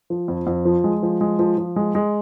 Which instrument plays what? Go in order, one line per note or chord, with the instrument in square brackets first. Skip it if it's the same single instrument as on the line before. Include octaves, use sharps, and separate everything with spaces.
[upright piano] F3
F2
F2
F3
G#3
F3
G#3
F3
F3
G#3
G#3